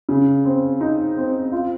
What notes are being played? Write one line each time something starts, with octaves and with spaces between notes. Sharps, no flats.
C#3
C4
D#4
C4
F4